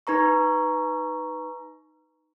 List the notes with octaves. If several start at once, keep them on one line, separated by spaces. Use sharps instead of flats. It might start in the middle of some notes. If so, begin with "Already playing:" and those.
D#4 B4 A#5 C#6